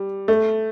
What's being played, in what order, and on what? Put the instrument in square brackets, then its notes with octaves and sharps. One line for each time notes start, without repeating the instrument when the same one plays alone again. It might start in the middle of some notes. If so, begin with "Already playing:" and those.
Already playing: [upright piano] G3
A3